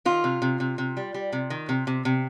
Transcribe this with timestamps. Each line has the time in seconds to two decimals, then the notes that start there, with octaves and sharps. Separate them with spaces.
0.05 D#3 F4
0.24 C3
0.42 C3
0.60 C3
0.78 C3
0.97 G3
1.14 G3
1.33 C3
1.50 D#3
1.69 C3
1.87 C3
2.05 C3